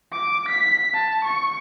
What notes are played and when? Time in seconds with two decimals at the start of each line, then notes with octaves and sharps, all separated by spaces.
0.13 D6
0.49 B6
0.94 A5
1.25 C#6